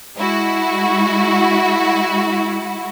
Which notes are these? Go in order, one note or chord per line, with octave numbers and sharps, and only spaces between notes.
G#3 E4 F#4